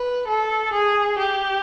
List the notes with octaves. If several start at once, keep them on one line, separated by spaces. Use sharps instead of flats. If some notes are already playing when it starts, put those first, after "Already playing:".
Already playing: B4
A4
G#4
G4